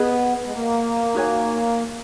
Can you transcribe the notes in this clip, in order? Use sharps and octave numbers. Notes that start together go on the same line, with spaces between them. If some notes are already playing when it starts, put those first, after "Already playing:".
Already playing: B3 G#4 B4 D#5
G#3
A#3
D#4 F#4 C#5 G#5